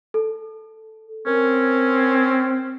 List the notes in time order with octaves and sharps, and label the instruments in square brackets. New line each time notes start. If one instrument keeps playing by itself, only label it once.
[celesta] A4
[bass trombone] C4 [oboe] C#4 [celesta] A#4